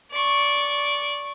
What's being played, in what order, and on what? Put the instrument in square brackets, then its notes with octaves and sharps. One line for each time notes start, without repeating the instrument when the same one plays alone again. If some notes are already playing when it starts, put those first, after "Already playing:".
[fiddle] D5 C#6